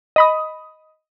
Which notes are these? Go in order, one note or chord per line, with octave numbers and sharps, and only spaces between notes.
D#5 B5 D#6